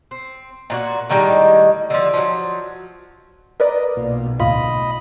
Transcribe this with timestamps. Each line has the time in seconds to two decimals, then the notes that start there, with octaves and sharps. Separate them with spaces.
0.11 C4
0.70 A#2 F4 F#4
1.10 A2 D#3 G3 G#3
1.90 D3 F3
2.14 F3 F#3
3.60 A#4 B4 D5 D#5
3.97 B1 A#2
4.40 D2 A2 F4 D#5 B5